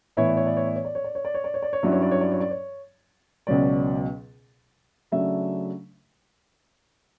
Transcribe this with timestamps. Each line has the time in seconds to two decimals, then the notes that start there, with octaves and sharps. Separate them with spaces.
0.17 A2 E3 B3 E4 C#5
0.27 D5
0.37 C#5
0.46 D5
0.57 C#5
0.66 D5
0.76 C#5
0.85 D5
0.95 C#5
1.04 D5
1.15 C#5
1.25 D5
1.34 C#5
1.44 D5
1.54 C#5
1.63 D5
1.73 C#5
1.83 G2 F#3 C#4 E4 D5
1.92 C#5
2.02 D5
2.11 C#5
2.21 D5
2.32 C#5
2.40 D5
2.50 C#5
3.47 C#2 B2 F#3 C#4 D5
5.12 C#3 F#3 A3 D4 E5